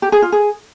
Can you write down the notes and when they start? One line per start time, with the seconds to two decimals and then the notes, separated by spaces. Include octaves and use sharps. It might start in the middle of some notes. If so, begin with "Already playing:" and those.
0.02 G4
0.12 G#4
0.22 F4
0.32 G#4